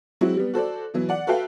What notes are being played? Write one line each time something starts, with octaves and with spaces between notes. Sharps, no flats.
F#3 G#3 C4 E4 F#4
G3 B3
F#4 A4 C5 D5
B2 E3 F#3
D5 F#5
F#4 A4 B4 E5 F5 G5